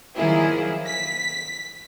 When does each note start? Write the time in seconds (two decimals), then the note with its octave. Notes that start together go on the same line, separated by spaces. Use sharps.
0.15 D#3 F3 F#3 A#3 E4 G#4
0.87 B6